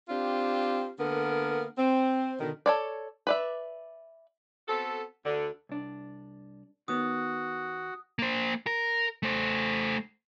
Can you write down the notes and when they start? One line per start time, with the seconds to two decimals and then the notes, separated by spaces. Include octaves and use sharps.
0.08 C4 D4 F4 G4
0.98 D3 A#3 B3 A#4
1.76 C4
2.39 B2 D3 D#3
2.66 A4 C#5 D5
3.27 B4 D5 E5
4.68 B3 C4 F#4 A4
5.25 D2 D3
5.69 C2 D4
6.88 D#3 B3 F#4 D#6
8.19 A#3 C5
8.67 A#4
9.23 A3 C5